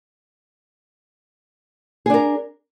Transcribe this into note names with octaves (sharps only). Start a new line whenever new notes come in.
D4 G#4 A#4